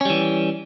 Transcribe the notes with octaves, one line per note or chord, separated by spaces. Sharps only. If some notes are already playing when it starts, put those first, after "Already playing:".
E3 G3 C#4